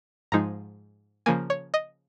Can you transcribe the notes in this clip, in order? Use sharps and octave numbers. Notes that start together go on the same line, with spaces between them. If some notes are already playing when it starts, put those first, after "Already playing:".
G#2 F3 G#3 D#4 A#5
C#3 F3 A#3 G#5
C#5
D#5